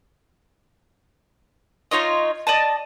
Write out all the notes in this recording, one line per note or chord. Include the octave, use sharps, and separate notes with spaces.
D#4 F4 C#5 D#5
D5 D#5 A5